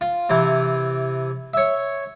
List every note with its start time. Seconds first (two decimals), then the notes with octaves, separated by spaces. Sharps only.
0.01 F4
0.29 C3 E3 C4
1.54 C#5 E5